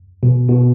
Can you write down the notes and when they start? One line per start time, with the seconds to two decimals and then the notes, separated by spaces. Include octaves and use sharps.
0.23 B2
0.49 B2